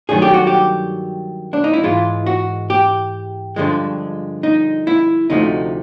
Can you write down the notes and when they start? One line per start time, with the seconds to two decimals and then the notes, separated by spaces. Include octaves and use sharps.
0.09 G2 D#3 F#3 A3 G#4
0.22 G4
0.34 F#4
0.47 G4
1.53 D4
1.64 D#4
1.73 E4
1.83 G#2 E3 G#3 F4
2.26 F#4
2.70 G4
3.56 G2 D3 F3 G#3
4.43 D#4
4.87 E4
5.30 D2 C3 F3 A3 D#4